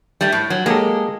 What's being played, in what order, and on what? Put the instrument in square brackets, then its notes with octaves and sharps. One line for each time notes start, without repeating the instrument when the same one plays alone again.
[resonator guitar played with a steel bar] G3 A3
A2
F#3
[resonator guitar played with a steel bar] G#3 [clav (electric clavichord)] A#3 G4 A4